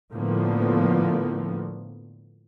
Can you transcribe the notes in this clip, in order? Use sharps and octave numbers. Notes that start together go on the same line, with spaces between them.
A2 D3 F3 A#3 B3